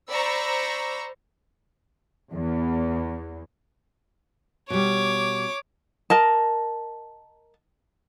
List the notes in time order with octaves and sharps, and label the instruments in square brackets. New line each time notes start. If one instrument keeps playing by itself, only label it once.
[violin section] C5 D5 A#5 B5 C#6 E6
[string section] E2
[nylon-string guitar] B2 G3 [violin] C#5 D6
[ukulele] A#4 D#5 A5